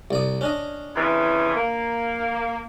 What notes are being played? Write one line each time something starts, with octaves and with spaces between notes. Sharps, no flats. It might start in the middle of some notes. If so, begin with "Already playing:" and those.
C2 D5 D#6
C#4 D4 D#5
F2 C#3 E3
A#3